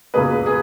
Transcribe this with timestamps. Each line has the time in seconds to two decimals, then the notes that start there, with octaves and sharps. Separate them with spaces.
0.14 C#2 B2 A#3 G#4 B4
0.46 G#4